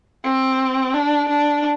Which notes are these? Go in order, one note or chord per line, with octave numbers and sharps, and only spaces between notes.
C4
D4
D4